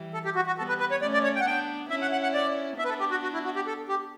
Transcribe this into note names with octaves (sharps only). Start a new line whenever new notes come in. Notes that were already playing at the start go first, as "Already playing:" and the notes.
Already playing: E3 G3
A4
G4
F#4
F#4
G3 B3 A4
B4
B4
C#5
A3 C#4 D5
D5
C#5
G5
F#5
B3 D4 G5
C#4 E4 E5
F#5
F#5
F#5
D5
B3 D4 E5
B4
A4
G4
F#4
F#4
E4
F#4
G4
A4
G4